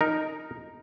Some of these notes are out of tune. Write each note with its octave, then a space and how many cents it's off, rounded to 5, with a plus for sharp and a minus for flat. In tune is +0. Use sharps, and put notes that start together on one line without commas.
D#4 +0 A#4 +0